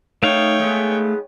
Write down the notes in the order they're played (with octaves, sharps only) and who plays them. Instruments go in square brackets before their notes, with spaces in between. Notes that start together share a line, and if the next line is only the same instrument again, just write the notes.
[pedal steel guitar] A3 F5 [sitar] D#4 [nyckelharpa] C#5 G5
[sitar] G#3 B3